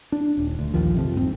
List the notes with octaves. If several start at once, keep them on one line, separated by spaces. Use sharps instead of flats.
D4
D#1
D2
A#1 D#2 F3
F2 C3 F3
G#2 B3 C4